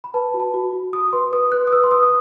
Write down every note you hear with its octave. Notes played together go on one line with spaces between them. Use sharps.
B5
B4 A5
F#4
A5
F#4
F#4
F#4 D#6
B4 C6
B4 D#6
B4 F#6
D#6
B4 E6
C6
B4 D#6
D#6